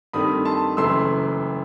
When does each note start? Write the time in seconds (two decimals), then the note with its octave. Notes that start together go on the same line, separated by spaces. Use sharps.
0.13 G2 D#3 A3 C4 B5 D#6
0.45 A5 C6
0.77 F#1 F#2 E3 A3 C6 E6